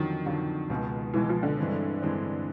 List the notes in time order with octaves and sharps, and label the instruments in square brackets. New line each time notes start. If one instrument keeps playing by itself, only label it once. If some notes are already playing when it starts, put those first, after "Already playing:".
Already playing: [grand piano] F2 D3 F#3 [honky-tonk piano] D#3
[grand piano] F2 D3 F#3
C#2 B2 G#3
[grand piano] C#2 B2 G#3 [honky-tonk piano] E3
[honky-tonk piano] F3
D3
[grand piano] G2 E3 G#3 C4
G2 E3 G#3 C4